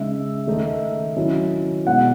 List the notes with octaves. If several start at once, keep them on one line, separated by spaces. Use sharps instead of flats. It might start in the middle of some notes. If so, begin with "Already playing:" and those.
Already playing: C#3 G#3 D#4 E5
D#3 A3 D#4
D#3 F#3 C#4 E4
B2 G#3 D#4 F#5